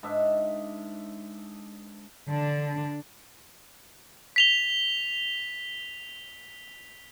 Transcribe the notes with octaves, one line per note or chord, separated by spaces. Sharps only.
G#2 D4 E5
D3 D4
B6 F7 G7